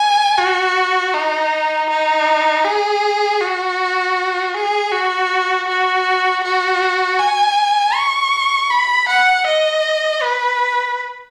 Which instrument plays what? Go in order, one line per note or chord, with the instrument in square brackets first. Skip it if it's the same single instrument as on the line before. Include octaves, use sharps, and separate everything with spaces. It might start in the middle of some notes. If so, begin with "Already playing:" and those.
Already playing: [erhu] G#5
F#4
D#4
D#4
G#4
F#4
G#4
F#4
F#4
F#4
G#5
C#6
B5
F#5
D#5
B4